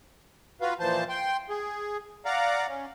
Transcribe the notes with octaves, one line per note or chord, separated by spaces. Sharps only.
F4 F#4 B4 F5
A#2 E3 F3 C5 A5
G5 C6
G#4
D5 F5 F#5 A#5
C#4